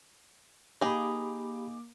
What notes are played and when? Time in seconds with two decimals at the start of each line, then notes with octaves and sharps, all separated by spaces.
0.81 A#3 D#4 G4 G#4 B5 D6